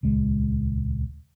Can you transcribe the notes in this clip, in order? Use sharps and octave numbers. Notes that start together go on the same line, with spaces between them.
D#1 C#2 G#3